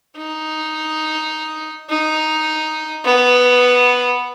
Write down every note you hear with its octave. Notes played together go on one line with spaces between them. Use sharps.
D#4
D#4
B3